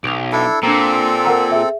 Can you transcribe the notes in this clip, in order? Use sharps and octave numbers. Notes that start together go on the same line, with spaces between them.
B1 D7 F7
D4 E4 A4
A#2 C4 D4 A4 A#5
A#4 F#5 A#5
G#4 E5